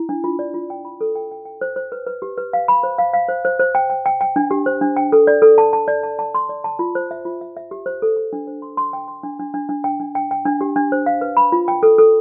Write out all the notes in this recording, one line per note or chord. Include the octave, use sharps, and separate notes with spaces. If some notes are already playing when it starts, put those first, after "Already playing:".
Already playing: E4
D4
F4
D5
F4
G5
B5
A4
G5
G5
G5
C5
C5
B4
B4
G4
B4
F5
B5
C5
F5
F5
C5
C5
C5
G5
G5
G5
G5
D4
G4
C5
D4
G5
A4
D5
A4
A5
A5
D5
A5
A5
C6
D5
A5
F4
C5
E5
F4
E5
E5
G4
C5
A4
A4
D4
C5
C6
C6
G5
C6
D4
D4
D4
D4
G5
D4
G5
G5
D4
G4
D4
C5
F5
B4
B5
F4
G5
A4
A4